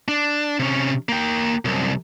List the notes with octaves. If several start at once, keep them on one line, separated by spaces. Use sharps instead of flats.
D4
C3 C#4
A#3 G5
C2 F#2